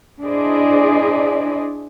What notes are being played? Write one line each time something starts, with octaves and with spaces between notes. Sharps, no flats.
D4 E4 G#4 C5 D5 D#5